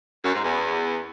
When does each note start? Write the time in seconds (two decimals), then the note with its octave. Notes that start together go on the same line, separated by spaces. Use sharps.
0.25 F#2
0.35 G#2
0.44 E2